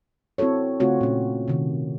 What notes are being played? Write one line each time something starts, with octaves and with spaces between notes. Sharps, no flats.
C4 E4 F#4 A4 C#5
C#3 A3 C4 F4 F#4 C#5
A#2 C#4
C3 D#3